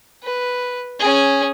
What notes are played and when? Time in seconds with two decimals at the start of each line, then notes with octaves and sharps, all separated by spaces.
0.23 B4
1.00 C#4 G#4